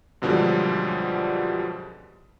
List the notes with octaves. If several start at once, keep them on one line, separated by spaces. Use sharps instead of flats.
F#2 B2 D3 F3 G3 G#3